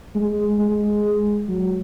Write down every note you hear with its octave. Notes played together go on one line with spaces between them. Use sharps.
G#3
G#3
F#3